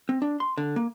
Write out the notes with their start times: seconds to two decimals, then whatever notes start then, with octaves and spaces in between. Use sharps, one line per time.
0.09 C4
0.22 D4
0.40 C6
0.58 D3
0.76 A#3